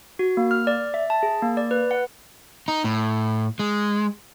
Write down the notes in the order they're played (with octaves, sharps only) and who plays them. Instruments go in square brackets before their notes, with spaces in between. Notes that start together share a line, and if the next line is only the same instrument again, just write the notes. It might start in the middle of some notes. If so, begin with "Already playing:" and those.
[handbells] F#4
A#3
F6
D5
E5
A5
G#4
A#3
D5
B4
F#5
[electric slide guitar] D#4
A2
G#3